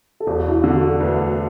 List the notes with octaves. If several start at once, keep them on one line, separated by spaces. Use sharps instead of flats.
A4
E1 F#4
E4
F#4
D3 F#4
A4
D2 B4